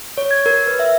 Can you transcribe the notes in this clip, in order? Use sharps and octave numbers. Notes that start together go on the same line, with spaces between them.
C#5
G#6
A#4
B4
E5